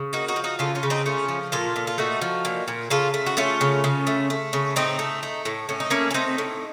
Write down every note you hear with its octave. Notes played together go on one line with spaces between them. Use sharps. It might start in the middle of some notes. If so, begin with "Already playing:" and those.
Already playing: C#3
A#3 D#4 F#4
D#4 F#4
F3
D#4 F#4
C#3 F4 A4
C#4 F4
C#3
C4 D#4
A3 C#4 F4
F3
A#2 F4 A4
A#2
F4
A3 D#4 F#4
F3
A#2
A#2
C#3 F4 A4
A3
F#4
A3 C#4 F4
C#3
C#3
A3
A3
C#3
A2 C4 D#4
A3
A3
A2
A2 C#4
D#4
A3 A#3 C#4
C#4
A3 C4 D#4
A2